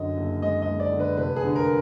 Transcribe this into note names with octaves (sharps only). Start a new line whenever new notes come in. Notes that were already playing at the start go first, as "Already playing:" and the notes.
Already playing: F#2 D3 D#5
F#1
G#3 D#5
D#5
G#3
D5
D3
B4
F1 B4
G#4
D3
A#4